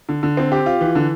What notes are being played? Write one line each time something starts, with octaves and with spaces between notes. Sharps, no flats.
D3
D3
C4
G4
F4
E3
D3